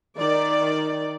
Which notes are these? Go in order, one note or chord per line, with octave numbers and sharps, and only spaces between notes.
D#3 D5